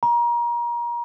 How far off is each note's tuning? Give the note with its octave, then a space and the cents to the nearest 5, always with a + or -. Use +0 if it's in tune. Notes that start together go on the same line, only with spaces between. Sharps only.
A#5 +30